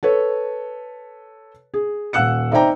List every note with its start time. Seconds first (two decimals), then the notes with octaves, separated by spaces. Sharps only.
0.03 A4 B4 C#5
1.74 G#4
2.13 D#1 F5 F#5 E6 F#6 C#7
2.52 D#4 C5 D5 E5 G5 A#5